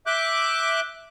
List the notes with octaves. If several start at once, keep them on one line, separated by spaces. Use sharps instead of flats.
E5 D6 F#6 G6